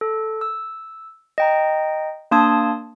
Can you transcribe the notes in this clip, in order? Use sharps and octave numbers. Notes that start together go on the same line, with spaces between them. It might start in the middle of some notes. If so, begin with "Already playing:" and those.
A4
E6
D#5 G5 A#5
A#3 D4 A5 C6 D#6 G#6